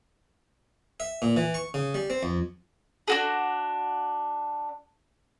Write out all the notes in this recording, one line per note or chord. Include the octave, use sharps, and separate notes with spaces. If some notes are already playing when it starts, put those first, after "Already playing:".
E5
A#2
E3
C#6
C#3
G3
C4
F2
D4 F#4 G#4